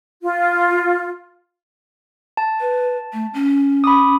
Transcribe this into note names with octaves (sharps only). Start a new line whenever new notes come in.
F4
A5
B4
A3
C#4
B5 D6 D#6